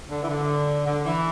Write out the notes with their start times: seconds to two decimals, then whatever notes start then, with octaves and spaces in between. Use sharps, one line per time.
0.10 D3
0.23 E3
0.29 D3
0.86 D3
1.05 E3